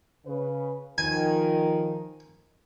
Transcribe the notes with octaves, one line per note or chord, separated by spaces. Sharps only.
C#3 B4
D#3 F3 G#5